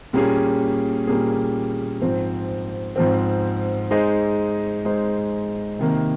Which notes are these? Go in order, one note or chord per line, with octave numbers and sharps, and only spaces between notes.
A#2 G3 A#3 C#4 G#4
A#2 G3 A#3 C#4 G#4
G#2 F3 C4
G#2 F3 C4
G#3 D#4 G#4 C5 D#5
G#3 D#4 G#4 C5 D#5
C3 D#3 A#3